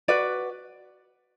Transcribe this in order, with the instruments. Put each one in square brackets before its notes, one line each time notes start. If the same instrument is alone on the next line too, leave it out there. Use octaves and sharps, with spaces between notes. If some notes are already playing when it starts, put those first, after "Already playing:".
[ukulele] F#4 B4 D5